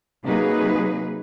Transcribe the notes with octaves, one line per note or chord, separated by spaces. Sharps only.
C3 F#3 A#3 D#4 G#4 B4